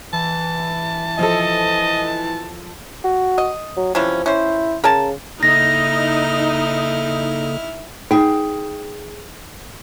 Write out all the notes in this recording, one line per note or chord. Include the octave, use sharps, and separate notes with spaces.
E3 A5
F3 A4 D#5
F#4
D#5
F#3
C3 E3 F3 C#4
C#4 E4 C5
C#3 A#4 G#5 A5
C#3 A#3 D#4 E4 A4 F6 A#6
D#4 G#4 G5